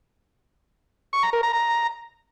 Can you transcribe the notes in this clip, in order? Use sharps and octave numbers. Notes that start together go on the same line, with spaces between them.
C#6
A#5
A#4
A#5
A#5